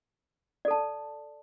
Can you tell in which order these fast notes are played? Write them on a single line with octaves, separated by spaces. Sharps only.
D5 A4 A5